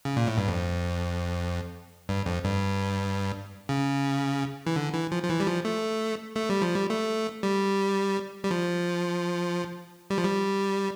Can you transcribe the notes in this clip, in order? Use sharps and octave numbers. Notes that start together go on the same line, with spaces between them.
C#3
A#2
A2
G2
F2
G2
F2
G2
C#3
E3
D3
E3
F3
F3
E3
G3
F3
A3
A3
G3
F3
G3
A3
G3
G3
F3
G3
F3
G3